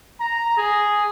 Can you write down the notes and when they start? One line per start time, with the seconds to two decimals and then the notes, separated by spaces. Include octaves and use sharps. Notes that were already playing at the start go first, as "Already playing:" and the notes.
0.21 A#5
0.57 G#4